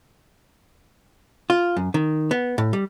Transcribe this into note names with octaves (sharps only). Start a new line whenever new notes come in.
F4
F#2
D#3
B3
A2
G3